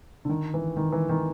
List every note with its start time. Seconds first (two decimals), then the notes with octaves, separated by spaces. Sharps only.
0.25 D3
0.29 D#3
0.54 E3
0.77 D#3
0.92 E3
1.09 D#3